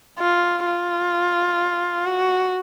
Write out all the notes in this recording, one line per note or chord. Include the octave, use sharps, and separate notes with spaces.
F4
F4
F#4